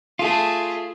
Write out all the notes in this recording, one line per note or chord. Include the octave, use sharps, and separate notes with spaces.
A3 F4 G#4